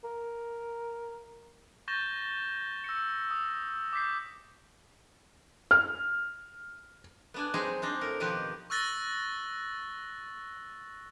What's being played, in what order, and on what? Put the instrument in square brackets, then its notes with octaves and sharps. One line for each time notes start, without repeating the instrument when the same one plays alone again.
[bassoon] A#4
[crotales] C#6 G6 A6 A#6 E7 G7
E6 A#6 C#7
D#6
D6 G6 B6 C7
[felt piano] F6
[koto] B3 D4 G#5
F#3 G#3 C4 D#4 G#4
C4 D4 D#4
A2 A#4
B2 D#3 F3 C4 G4 B4
[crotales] C#6 E6 F#6 A6 A#6 G7